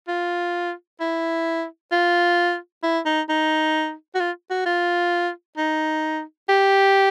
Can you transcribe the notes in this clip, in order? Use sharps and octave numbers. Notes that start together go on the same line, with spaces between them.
F4
E4
F4
E4
D#4
D#4
F#4
F4
F#4
F4
D#4
G4